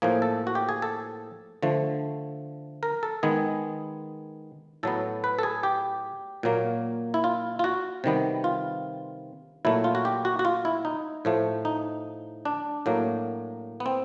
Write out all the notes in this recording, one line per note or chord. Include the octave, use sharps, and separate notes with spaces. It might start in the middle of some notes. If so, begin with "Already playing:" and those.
A2 F3 A#3 G#4
A4
F#4
G4
G#4
A4
D3 F3 A3
A#4
A4
D#3 G#3 B3 G#4
A2 F#3 B3 A4
B4
A4
G#4
G4
A#2 F#3 A#3
E4
F4
F4
F#4
C3 D#3 G3 B3
F4
A#2 F#3 A3 E4
F4
F#4
G4
F#4
F#4
F4
E4
D#4
A2 F3 A3
D#4
D4
A2 F#3 A#3
B3
C4